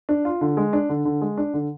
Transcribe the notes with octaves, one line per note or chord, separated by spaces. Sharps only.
D4
F4
D3
G#3
D4
D3
D3
G#3
D4
D3